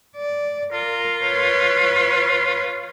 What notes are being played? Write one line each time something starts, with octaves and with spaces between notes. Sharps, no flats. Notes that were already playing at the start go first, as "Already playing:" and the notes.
D5
F4 A#4
B4 C#5